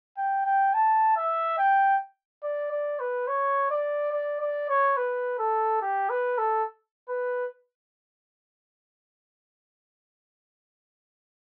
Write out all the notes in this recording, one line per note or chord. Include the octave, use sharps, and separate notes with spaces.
G5
G5
A5
E5
G5
D5
D5
B4
C#5
D5
D5
D5
C#5
B4
A4
G4
B4
A4
B4